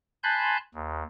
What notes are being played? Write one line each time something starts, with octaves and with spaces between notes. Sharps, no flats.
G#5 A5 B5 C6 F#6 G6
D#2